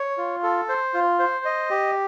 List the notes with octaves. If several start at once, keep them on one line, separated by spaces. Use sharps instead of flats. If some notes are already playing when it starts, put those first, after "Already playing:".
Already playing: C#5
F4
A4
C5
F4
C5
D#5
G4